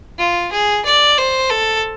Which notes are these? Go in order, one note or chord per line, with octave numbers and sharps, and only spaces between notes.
F4
G#4
D5
C5
A4